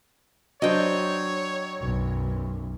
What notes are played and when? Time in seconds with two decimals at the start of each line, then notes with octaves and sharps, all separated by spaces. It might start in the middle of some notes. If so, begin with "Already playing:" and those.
0.62 F#3 D4 C5 C#5 D#5 G5
1.79 B1 F#2